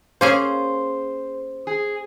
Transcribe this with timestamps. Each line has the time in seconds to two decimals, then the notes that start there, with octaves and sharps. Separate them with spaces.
0.21 A#3 C#4 G#4 C5
1.67 G#4